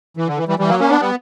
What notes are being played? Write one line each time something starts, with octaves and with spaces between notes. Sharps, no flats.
E3
D3
E3
E3 G3
E3 G3
F#3 A#3
A#3 C#4
B3 D4
G3 B3